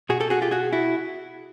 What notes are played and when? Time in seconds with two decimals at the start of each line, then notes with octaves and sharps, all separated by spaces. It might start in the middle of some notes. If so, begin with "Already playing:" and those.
0.09 B2 F#4 G#4
0.20 G4 A4
0.30 F#4 G#4
0.42 F4 G4
0.51 F#4 G#4
0.73 E4 F#4